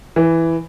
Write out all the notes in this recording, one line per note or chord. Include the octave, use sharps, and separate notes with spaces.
E3